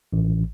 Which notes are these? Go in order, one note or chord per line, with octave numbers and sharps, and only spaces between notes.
A1